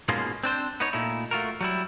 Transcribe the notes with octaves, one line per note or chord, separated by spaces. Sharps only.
G#2 B2 G#3 A#3 C#4 F4
C4 D4 C5
B3 D#4 C#5
A#2 A3 D#4 E4
A3 F4 F#4 A#4
F#3 G3 E4